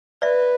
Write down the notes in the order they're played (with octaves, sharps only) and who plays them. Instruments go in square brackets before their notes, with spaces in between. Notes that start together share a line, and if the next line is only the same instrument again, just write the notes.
[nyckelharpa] B4 [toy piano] D5 E5